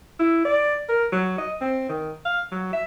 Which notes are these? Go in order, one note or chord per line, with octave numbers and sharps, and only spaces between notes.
E4
D5
A#4
F#3
D#5
C4
D#3
F5
F#3
E5